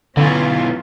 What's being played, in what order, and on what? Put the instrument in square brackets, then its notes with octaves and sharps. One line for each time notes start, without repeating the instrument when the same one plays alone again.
[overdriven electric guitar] B1 E3 [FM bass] D3 [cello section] C#4 F4